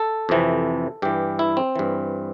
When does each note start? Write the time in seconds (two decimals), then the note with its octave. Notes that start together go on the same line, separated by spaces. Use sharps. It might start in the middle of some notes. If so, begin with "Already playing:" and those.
Already playing: A4
0.29 F2 C3 E3
1.02 G2 E3 G4
1.39 E4
1.57 C4
1.75 G2 E3